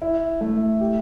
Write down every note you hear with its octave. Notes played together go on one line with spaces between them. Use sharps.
E4
A3
G4